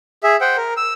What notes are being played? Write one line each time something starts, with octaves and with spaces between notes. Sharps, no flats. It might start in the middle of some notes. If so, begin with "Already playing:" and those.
G#4 E5
C5 F#5 G5
A#4
E6